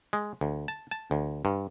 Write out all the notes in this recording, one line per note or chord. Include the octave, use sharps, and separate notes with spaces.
G#3
D2
A5
A5
D2
G2